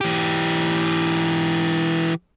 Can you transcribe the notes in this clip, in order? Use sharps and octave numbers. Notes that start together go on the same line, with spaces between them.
E3 G4